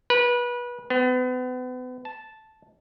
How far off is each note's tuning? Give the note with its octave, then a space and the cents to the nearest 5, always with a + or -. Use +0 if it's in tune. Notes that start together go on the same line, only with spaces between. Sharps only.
B4 -25
B3 +35
A5 -5